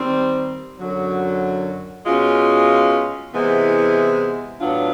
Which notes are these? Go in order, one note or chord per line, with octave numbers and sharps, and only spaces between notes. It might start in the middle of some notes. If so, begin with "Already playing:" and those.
Already playing: D#3 G3 C4
F#2 D3 F#3
B2 G#3 C#4 F4
C3 E3 G#3 B3 E4
A2 F#3 B3 D4 F4